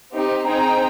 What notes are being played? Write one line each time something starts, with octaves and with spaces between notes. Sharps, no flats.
C4 D#4 G4
C4 D#4 G#4 G5 A#5